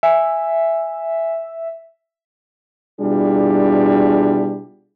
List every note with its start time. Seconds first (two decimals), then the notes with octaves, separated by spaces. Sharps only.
0.03 E5 G#5
3.00 B2 G3 D4 E4 F4 G#4